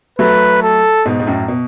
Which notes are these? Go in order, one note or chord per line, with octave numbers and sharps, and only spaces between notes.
F#3 A3 B4
A4
G#2 B2
G#2
F#2 A2
B2